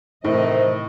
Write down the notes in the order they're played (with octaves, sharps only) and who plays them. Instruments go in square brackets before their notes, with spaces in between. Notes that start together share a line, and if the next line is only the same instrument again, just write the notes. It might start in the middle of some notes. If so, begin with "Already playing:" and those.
[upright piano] A2 [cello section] C3 E3 D#5 [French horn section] D#3 A3 C5